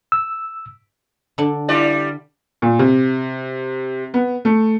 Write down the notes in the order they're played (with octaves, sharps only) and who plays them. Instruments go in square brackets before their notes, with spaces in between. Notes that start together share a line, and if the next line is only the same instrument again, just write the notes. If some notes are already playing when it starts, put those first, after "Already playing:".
[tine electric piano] E6
[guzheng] D3 D4
[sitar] G3 E4 D5
[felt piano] A#2
C3
B3
A3